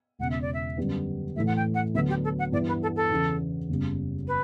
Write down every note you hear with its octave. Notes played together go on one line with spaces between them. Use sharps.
E1 E2 C#3 F#5
E5
D5
E5
F#2 D3 G3 B3
A2 E3 A3 E5
F#5
G5
F#5
D2 D3 F#3 B3 E5
G4
A4
F#5
G2 E3 B3 E4 D5
B4
A4
A4
E2 C#3 E3 B3
F#1 E2 C#3 G3
B4